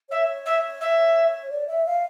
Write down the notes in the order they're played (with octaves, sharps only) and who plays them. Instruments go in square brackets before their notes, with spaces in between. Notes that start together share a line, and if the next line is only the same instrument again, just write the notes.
[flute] C#5 [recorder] E5
[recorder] E5
E5
[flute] D5
E5
F5